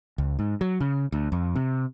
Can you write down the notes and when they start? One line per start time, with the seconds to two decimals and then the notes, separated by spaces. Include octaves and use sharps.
0.18 C#2
0.39 G#2
0.61 F#3
0.80 C#3
1.12 D2
1.32 F2
1.56 C3